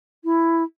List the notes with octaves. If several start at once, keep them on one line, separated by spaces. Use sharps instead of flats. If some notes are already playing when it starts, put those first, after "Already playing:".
E4